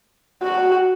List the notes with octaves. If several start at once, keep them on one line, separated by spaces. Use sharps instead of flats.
F#4